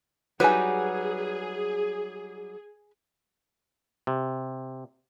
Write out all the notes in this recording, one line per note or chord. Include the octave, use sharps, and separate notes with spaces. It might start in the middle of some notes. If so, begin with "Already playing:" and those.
F#3 G3 D#4 G#4 B4 G#5
C3